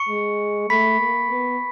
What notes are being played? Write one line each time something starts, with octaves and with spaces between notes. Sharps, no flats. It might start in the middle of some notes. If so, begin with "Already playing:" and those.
Already playing: C#6 C#7
G#3
A3 B5 B6
A#3
B3